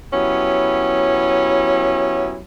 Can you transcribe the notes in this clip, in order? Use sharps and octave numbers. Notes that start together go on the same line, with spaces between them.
F#3 B3 C#4 E4 G4